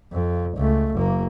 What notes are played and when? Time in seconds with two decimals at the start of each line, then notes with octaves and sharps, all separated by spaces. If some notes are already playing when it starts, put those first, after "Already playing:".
0.12 F2
0.57 C#2 A3
0.95 F#1 A#3